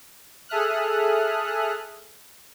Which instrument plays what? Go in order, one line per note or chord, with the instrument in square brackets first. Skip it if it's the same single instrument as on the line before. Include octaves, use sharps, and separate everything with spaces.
[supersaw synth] G#4 A4 E5 D#6 F6 F#6